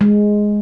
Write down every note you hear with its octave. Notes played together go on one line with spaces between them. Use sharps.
G#3